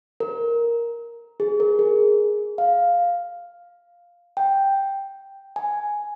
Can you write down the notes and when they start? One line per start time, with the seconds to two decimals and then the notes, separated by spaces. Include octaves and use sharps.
0.20 A#4
1.40 G#4
1.60 A#4
1.79 G#4
2.58 F5
4.37 G5
5.56 G#5